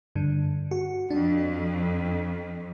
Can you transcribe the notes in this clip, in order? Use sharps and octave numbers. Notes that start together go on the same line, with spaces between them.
G2 D3
F#4
F2 D4